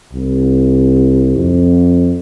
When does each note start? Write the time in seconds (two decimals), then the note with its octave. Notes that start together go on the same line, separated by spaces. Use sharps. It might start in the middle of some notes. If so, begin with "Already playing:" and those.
0.13 C2
1.36 F2